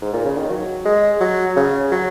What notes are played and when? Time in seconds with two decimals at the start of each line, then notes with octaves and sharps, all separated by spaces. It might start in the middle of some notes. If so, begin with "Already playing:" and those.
0.02 G#2
0.13 A#2
0.25 C#3
0.38 D#3
0.50 F#3
0.86 G#3
1.21 F#3
1.56 C#3
1.92 F#3